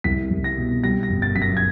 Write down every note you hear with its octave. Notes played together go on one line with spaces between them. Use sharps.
C2 B6
C2
A#6
B2
G3 A#6
A#6
G1
A6
F#2 B6
A#6
G#6